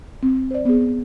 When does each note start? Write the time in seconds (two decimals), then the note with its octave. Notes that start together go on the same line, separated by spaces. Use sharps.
0.23 C4
0.51 C5 D5
0.65 B3 G#4